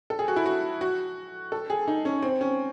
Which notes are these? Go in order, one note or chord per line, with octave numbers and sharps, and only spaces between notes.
A4
G#4
F#4
E4
F#4
F#4
A4
G#4
D#4
C#4
C4
C#4